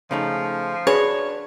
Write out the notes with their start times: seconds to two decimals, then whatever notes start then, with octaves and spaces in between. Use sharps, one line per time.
0.11 C#3 F3 A3 D#4
0.87 D4 F#4 G#4 B4 C#5